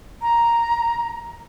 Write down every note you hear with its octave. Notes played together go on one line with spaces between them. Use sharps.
A#5